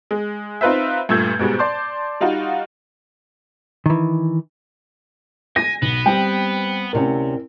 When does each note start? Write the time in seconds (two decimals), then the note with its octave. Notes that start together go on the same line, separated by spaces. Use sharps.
0.11 G#3
0.61 C4 D#4 F4 B4 C5 E5
1.09 G2 A#2 A3 E6 G6 G#6
1.39 G#2 B2 G3 G#3
1.59 D5 A5 C6 D6 G6
2.21 G3 D#4 F4 F#4
3.86 D#3 E3
5.56 G#5 A#6
5.82 B1 B3
6.06 G3 C4 G5
6.93 D2 C3 C#4 E4 A#4